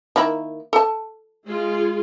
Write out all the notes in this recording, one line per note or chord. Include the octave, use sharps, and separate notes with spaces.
D#3 A#3 E4
A4 A5
G#3 F4 G#4